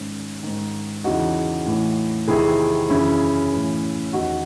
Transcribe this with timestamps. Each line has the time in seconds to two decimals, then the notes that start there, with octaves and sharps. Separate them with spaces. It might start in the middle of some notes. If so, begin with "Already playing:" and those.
Already playing: G#2 D#3 C#4
0.43 G#2 D#3
1.04 E2 C#3 E3 D#4 F#4
1.66 A2 E3
2.28 E2 C3 D#3 E4 G#4
2.90 F#2 C#3 E3 C#4 E4
3.52 A2 E3
4.13 E2 D#3 D#4 F#4